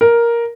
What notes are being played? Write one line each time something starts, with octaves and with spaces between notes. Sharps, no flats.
A#4